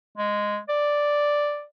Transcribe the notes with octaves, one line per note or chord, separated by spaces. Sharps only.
G#3
D5